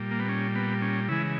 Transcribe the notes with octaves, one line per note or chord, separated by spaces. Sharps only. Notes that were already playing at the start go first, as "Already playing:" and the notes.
Already playing: A#2 G3
A#3
B3
C#4
B3
C#4
C#3 E3 G#3 E4